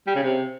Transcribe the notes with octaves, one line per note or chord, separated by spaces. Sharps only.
G3
C#3
C3